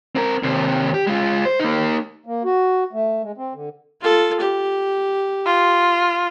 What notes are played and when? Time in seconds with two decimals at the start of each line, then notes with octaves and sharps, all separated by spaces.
0.16 C4 A#4
0.43 D#2 C3
0.94 G4
1.07 G#3 F4
1.45 C5
1.60 A#3 D#4
2.26 A#3
2.44 F#4
2.93 A3
3.23 G#3
3.38 C4
3.54 D3
4.01 F4 A4
4.40 G4
5.46 F4